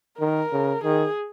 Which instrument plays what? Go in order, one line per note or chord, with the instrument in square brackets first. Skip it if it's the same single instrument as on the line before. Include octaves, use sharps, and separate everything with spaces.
[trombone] D#3 [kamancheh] A#4
[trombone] C#3
[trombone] D#3 [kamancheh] G#4